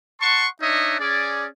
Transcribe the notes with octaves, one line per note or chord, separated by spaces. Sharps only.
F#5 A5 C6 C#6
D4 D#4 C#5 D#5 E5
C#4 G#4 D5